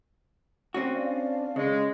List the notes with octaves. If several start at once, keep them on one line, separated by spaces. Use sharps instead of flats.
C4 C#4 F#4
D4 D5 F5
C#3 G#3